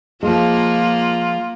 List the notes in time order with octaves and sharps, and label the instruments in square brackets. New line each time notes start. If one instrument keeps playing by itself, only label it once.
[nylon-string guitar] F3 G#3 [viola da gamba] A#3 [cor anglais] F4